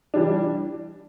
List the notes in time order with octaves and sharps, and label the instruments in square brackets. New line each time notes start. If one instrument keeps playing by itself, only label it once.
[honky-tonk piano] E3 G3 D4